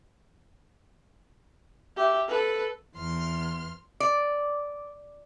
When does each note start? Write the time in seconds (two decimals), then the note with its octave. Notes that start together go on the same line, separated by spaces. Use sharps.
1.97 G4 E5
2.28 A4 B4
2.95 E2 C6 F6
4.00 D5